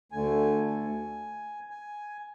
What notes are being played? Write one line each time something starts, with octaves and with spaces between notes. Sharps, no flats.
D2 D3 A3 G#5
G#5
G#5